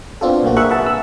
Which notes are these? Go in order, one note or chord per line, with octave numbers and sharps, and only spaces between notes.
B3 C4 D4 F4 F#4 A4
B1 A#2 A#3 F#4
G#4 A#4 E5 F#5 C#6 F#6
G#4 B4 E5 F#5 A5
E6